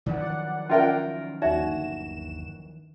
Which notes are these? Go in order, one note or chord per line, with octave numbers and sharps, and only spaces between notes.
D#3 F3 F#3 D5 F#5
C#4 F4 A#4 D#5 E5 G5
G1 D#2 D#4 F#4 D5 E5 E7